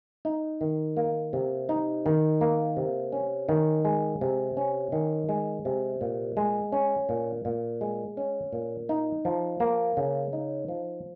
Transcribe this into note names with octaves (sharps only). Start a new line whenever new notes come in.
D#4
D#3
A#3
C3
D#4
D#3
A#3
C3
C#4
D#3
G#3
C3
C#4
D#3
G#3
C3
A#2
G#3
C#4
A#2
A#2
G#3
C#4
A#2
D#4
F3
A#3
C#3
D#4
F3